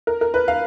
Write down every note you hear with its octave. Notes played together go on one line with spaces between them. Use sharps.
A#4
A#4
B4
F5